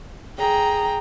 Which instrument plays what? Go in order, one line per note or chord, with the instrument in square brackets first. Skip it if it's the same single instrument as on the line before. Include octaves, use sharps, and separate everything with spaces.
[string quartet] G#4 G5 A#5